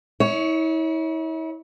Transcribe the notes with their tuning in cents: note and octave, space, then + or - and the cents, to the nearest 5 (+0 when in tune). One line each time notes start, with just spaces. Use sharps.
E4 -40 C#5 +10